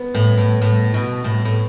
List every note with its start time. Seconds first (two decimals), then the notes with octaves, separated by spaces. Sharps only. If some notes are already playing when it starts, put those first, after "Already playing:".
Already playing: B3
0.14 A2
0.38 A2
0.62 A2
0.94 B2
1.24 A2
1.45 A2